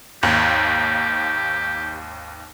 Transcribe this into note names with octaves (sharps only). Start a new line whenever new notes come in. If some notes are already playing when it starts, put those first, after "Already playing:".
G#1 D#2 G4